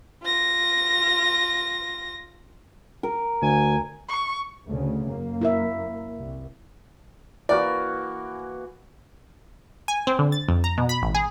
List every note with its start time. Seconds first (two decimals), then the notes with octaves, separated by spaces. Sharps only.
0.23 F4 A#6
3.03 A#4
3.42 D2 G#5
4.09 C#6
4.67 D2 C#3 A3
5.05 F#2 A#3
5.41 E4 A#4 E5
6.17 C2
7.49 E3 A#3 F#4 D5
9.88 G#5
10.07 C4
10.19 D3
10.32 A6
10.48 F2
10.64 A#5
10.78 B2
10.89 B5
11.02 A1
11.15 G#4